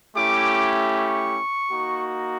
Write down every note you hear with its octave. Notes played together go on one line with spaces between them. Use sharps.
A3 C#4 E4 G4 D6
C#6
A#3 D#4 F#4